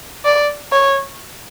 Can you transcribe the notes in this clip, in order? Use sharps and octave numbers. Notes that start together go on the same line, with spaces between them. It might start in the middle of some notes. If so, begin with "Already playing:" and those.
D5
C#5